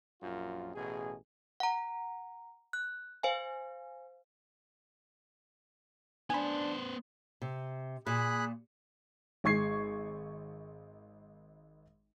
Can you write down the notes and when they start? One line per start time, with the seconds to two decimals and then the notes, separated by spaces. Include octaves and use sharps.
0.22 A#1 F#2 F4
0.75 A1 B2 G#4
1.60 F#5 A#5
2.73 F#6
3.23 C5 F5 G#5
6.30 B3 D4 C5 G#5 B5
7.42 C3
8.07 A#2 G#4 B5 F#6
9.44 G#1 G#3 C#6 G#6 C7